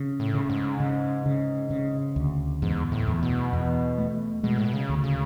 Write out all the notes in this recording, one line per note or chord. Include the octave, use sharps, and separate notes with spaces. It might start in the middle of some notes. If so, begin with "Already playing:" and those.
Already playing: C#3
A2
C#3
G#2
C#3
C#3
C#3
D2
E2 G#2
A2
E2
B2
E2
A3
B2 G#3
A2
B2
C#3
D2
C#3